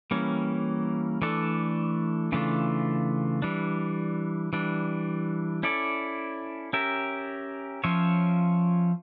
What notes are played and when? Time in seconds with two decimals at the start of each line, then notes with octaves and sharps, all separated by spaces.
0.11 E3 G3 A#3 C#4
1.22 E3 A3 D4 A4 D5
2.32 C#3 E3 A3 D4 F4
3.42 E3 G3 D4
4.53 E3 G3 D4
5.63 C#4 E4 A4 D5
6.73 C#4 G4 A#4 E5
7.84 F3 C#4 F4 C#5 E5